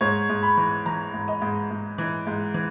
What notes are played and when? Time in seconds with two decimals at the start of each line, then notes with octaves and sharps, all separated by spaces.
0.01 G#2 C#5
0.29 G#2
0.43 B5
0.57 E3
0.86 E3 A#5
1.14 G#2
1.28 D#5
1.42 G#2
1.71 G#2
1.98 E3
2.27 G#2
2.54 E3